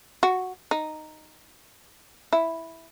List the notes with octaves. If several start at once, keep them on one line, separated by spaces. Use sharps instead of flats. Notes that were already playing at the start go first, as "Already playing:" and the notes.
F#4
D#4
E4